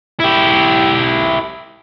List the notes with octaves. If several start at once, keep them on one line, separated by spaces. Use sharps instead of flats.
E4 G4